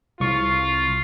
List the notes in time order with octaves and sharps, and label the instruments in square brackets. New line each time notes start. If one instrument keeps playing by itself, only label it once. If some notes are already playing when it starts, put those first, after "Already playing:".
[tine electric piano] C2 C#6 [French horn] F4